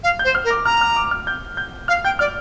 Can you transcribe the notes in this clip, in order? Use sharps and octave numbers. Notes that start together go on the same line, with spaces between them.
F5
G6
C5
F6
A#4
D6
A#5 F6
F6
D6
F6
G6
G6
F5 F6
G5 G6
D5 F6